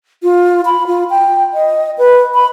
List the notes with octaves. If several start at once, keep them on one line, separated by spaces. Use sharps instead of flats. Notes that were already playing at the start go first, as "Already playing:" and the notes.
F4
B5
F4
G5
D#5
B4
B5